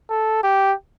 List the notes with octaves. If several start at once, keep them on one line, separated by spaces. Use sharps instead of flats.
A4
G4